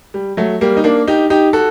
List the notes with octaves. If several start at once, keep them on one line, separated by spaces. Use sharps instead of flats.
G3
F#3 A3
G3 A#3
D#4
A#3 D4
D#4 G4
D#4 G4
F#4 A4